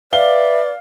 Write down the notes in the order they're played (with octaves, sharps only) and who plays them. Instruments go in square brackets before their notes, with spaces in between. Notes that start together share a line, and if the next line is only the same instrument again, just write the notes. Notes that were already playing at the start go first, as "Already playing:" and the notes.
[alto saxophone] B4 [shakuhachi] D5 [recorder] E5 [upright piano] F5 G7